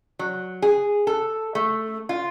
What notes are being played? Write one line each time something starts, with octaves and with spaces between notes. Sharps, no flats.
F#3
G#4
A4
A3
F4